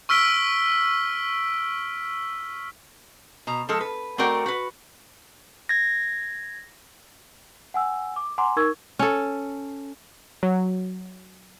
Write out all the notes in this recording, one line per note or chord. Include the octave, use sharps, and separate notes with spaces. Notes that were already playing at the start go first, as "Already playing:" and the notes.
C#6 E6 F6 B6 D7 G7
B2 A#5
F3 G#3 A4
B4
A3 C4 F#4 A#4 D5 G5
F#4 B4
G#6 A#6
F#5 G#5 E6
D6
F#5 G#5 A#5 C6 D6
D#4 A#4 C#6 E6 G#6
C#4 A4
F#3